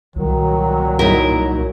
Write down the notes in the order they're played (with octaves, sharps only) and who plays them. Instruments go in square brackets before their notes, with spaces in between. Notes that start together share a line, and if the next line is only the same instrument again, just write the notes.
[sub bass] C2 [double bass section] A#2 F#3 [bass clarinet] D#3
[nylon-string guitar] D#4 E4 A#4